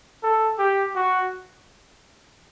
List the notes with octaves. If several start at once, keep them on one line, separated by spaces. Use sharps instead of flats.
A4
G4
F#4